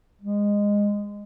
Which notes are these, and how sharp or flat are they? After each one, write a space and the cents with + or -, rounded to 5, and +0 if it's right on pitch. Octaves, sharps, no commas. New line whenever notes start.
G#3 -15